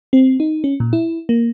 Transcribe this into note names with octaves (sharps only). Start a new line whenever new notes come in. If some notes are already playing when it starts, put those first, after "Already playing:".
C4
D#4
C#4
A#2
E4
A#3